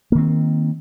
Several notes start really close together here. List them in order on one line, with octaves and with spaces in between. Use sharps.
A#3 D#3 C4